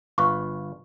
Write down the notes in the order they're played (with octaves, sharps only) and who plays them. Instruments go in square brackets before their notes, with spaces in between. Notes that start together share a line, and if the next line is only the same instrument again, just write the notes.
[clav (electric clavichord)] G1 F4 B4 [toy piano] C#6